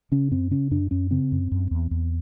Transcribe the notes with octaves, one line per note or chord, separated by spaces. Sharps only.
C#3 C#4
F#2 C4
C#3 C#4
F#2 D4
F#2 C#4
C#3 C4
F#2
F#2
E2
E2